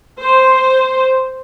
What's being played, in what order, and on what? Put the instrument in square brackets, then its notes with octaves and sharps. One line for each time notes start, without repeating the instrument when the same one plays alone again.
[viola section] C5